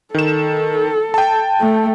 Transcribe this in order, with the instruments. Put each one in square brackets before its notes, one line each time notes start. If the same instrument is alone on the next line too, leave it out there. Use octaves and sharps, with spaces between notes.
[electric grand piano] D#3 E7 [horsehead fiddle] A4
[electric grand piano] G5 A5
[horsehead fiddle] A3